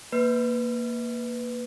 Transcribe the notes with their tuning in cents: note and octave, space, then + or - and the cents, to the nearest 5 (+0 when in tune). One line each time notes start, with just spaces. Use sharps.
A#3 +0 B4 +5